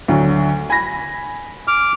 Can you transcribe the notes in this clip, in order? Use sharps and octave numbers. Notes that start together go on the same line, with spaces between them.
D2 D3 F#3
G#5 B5 A#6
D6 F6